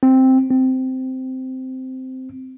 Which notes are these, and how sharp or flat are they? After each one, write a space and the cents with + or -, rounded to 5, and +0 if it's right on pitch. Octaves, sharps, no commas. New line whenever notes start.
C4 +0
C4 -10